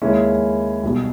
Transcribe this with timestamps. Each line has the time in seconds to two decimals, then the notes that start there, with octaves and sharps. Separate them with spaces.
0.02 D#2 C#3 G#3 C#4 E4
0.83 B1 B2 G3